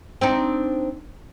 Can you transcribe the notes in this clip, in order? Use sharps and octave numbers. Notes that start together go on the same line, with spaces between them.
C4 D4 D#4